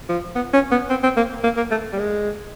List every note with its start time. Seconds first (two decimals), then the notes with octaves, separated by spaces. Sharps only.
0.09 F3
0.35 B3
0.54 C#4
0.71 B3
0.90 C4
1.03 C4
1.17 A#3
1.44 A#3
1.57 A#3
1.71 A3
1.93 G3
1.98 G#3